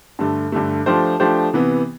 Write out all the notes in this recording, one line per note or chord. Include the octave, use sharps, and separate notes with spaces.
G2 D3 A3
G2 D3 A3
F3 A3 D4 G4 C5
F3 A3 D4 G4 C5
C3 E3 B3